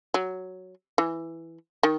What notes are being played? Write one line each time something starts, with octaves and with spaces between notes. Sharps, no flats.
F#3
E3
D#3